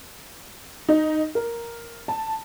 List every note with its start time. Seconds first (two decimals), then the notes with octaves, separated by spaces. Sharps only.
0.89 D#4
1.35 A#4
2.08 A5